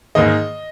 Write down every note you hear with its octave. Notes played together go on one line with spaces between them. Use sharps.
G#2 D#3 A#3 D#5